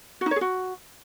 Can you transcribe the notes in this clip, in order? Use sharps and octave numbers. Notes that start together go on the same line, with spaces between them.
F#4
D#4
C#5
G#4
F#4